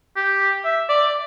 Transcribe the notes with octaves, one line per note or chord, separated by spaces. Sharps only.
G4
E5
D5